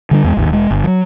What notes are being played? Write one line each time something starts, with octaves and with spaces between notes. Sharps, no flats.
D3 G3 D4
E2 G#3
G#1 D#2
E1 G#3
G1
F3 F#3